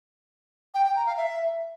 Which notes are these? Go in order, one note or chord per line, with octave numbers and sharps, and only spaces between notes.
G5
G5
A#5
F5
E5